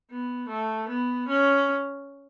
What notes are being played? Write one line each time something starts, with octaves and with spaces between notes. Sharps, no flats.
B3
A3
B3
C#4